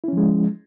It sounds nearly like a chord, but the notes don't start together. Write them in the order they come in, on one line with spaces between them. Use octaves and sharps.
E4 C#4 F3 G#3